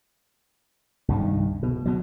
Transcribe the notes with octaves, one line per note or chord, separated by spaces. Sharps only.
C2 G2 D#3
B2
B2 F#3